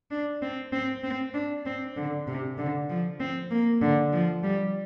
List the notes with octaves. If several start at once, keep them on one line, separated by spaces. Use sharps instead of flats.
D4
C4
C4
C4
D4
C4
D3
C3
D3
F3
C4
A#3
D3
F3
G3